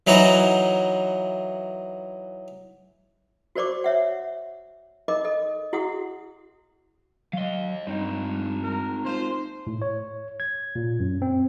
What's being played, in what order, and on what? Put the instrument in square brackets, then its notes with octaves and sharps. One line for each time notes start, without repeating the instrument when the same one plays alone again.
[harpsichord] E3 F#3 D#4 F#4 C#5
[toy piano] F#4 A#4 C5 D5 C#6 D6
C#5 E5 F#5
D#4 A#4 D#5 D6
A4 D#5
E4 F#4 G#4 F#5 D#6
[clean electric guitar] F#3 C6 [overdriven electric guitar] D#5 F5
[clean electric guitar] G2 [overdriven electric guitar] C4 D#4
[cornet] A#4
[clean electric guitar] A#3 F4 [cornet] C5
[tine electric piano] A2
C#5
G#6
A#2
F#2
C4